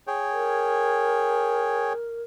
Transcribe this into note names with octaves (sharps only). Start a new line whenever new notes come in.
G#4 C#5 G5
A#4